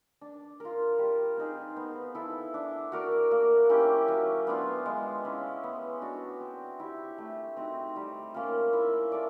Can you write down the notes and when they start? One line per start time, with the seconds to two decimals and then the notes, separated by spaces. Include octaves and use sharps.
0.21 D4
0.60 F4 A#4
0.99 G3
1.37 C4 D#4 G#4
1.77 B3
2.15 E4 A4
2.54 D4
2.92 F#4 A#4 D5
3.31 A#3
3.69 C#4 E4 G4
4.08 F#3
4.47 B3 D4 F4
4.86 G#3
5.25 C#4 E4
5.64 B3
6.02 D4 F#4
6.40 C4
6.80 E4 G4
7.18 A3
7.57 C4 D#4 F#4
7.96 G3
8.34 A#3 C#4 F4
8.73 E4
9.12 A4 D5